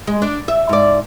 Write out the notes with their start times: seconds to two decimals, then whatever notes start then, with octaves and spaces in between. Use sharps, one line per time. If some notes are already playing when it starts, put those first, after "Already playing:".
0.07 G#3
0.22 D4
0.48 E5
0.69 G#2 D5